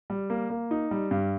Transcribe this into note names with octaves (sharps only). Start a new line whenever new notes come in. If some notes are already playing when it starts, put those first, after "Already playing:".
G3
A#3
A#3
D#4
G3
G2